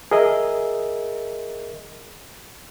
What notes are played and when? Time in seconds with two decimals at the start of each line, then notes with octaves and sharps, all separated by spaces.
0.11 G#4 A#4 D#5 E5